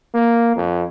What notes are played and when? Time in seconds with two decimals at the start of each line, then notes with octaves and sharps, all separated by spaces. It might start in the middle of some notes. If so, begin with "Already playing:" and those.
0.15 A#3
0.56 F2